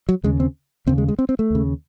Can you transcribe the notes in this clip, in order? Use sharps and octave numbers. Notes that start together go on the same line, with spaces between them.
F#3
D#2 C#3 G#3
C4
D#2 C#3 C4
G#3
G#3
C4
C4
A3
D#2 C#3